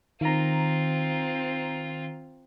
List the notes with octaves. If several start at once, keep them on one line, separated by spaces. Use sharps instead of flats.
D#3 C4 F4 A#5